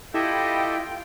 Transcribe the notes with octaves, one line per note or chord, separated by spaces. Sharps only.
E4 F4 G4 A4 D#5 G5